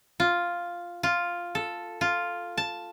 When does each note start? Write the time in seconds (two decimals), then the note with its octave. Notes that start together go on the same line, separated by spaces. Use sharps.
0.20 F4
1.03 F4
1.55 A4
2.01 F4
2.57 A5